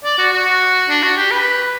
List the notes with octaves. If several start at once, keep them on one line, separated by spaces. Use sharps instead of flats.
D5
F#4
F#4
D4
F#4
G4
B4